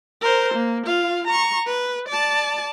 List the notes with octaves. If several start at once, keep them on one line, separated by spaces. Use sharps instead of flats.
A#4 C5
A#3
F4 F5
A#5 C#6
B4
D5 A5